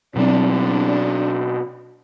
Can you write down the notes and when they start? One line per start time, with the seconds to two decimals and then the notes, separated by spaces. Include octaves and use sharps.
0.16 B2 F#3 C4 D4
0.52 D4